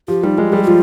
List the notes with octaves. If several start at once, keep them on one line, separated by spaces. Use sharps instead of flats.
F3 G4
G3 D#4
G#3 F4
G3 G#4
G4
F3 F4